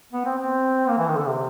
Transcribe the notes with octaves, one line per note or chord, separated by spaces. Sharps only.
B3
C4
C4
A#3
E3
D#3
D3
C3